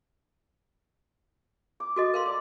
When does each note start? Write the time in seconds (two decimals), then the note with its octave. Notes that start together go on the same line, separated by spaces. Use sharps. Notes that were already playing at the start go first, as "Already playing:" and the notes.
1.80 D6
1.96 F#4 A4 D#5
2.14 A#4 F5 C6
2.26 D5 A#5